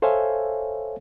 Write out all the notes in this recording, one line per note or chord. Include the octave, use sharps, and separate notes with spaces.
A4 C5 C#5 E5 F5 G#5